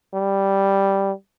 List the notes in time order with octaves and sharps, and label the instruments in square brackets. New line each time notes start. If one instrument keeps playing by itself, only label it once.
[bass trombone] G3